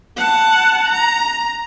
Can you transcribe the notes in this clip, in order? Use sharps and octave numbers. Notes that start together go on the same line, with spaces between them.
F#5 A5
A#5